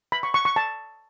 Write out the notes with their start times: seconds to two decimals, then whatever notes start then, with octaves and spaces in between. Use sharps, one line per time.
0.12 B5
0.23 C#6
0.34 C#6
0.45 C#6
0.56 A5